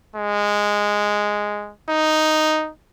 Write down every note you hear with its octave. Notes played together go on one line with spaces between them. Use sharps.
G#3
D#4